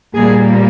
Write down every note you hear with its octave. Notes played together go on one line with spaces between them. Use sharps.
A#2 G3 A#3 G#4